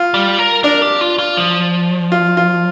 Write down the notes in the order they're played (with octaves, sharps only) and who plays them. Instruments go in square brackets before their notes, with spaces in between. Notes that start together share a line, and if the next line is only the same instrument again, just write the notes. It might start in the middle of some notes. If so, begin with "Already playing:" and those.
Already playing: [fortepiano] F4
[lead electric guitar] G3
A#4
[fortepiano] D4 [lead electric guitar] A#4
[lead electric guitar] G4
F4
F4
F3
[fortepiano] F4
F4